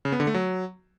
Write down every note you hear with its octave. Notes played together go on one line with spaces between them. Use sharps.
C#3
B3
D3
A3
F#3